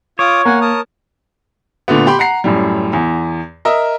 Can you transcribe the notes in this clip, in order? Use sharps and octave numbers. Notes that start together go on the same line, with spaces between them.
F4 C#5 D6 D#6
A#3 F#5 G#5
A#4 A5 D#6
A#2 D3 A3 B3
G4 G5 B5 C6
F#5 A#5 C7
F#2 A2 G3
E2
A#4 D#5 E5